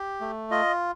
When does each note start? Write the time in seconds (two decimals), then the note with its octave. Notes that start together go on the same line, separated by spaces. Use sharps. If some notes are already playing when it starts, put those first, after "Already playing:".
Already playing: G4
0.21 A3
0.51 F4 D#5